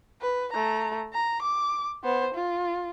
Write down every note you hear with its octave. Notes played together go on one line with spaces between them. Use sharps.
B4
A3 A#5
A#5
D6
B3 C5
F4